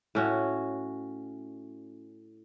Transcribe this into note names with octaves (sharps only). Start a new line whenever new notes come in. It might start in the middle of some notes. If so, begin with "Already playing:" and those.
A2 C#4 F#4